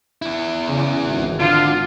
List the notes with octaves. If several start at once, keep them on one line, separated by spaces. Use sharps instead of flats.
E2 E4
C#3
G#1
D3 F4